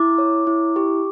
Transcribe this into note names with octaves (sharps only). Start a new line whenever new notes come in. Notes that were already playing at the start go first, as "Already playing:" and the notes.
Already playing: E4 D6
C#5
E4
G4